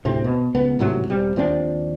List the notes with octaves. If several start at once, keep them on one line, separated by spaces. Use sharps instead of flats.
D2 A2 C3 C4
B2
C#2 B3
A1 G#2 C3 F#3
E1 G3 C4
D#2 F3 C4 D4